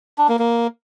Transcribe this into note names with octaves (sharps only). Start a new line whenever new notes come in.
D4
A#3
A#3